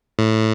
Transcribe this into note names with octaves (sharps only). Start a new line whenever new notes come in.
A2